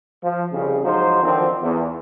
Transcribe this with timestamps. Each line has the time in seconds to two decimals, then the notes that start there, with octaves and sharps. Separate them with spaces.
0.24 F3
0.52 C2 F2 C#3
0.84 G#2 F3 F#3 D#4 C5
1.23 D3 D#3 F3 C4
1.61 E2